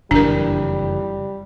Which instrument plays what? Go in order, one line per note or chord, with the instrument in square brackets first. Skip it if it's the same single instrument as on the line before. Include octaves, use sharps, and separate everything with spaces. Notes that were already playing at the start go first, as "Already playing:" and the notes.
[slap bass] F#1 F2 E3 [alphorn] G3 [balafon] D4 A#4